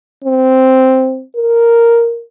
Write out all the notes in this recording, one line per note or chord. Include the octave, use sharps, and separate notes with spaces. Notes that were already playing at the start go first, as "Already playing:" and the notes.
C4
A#4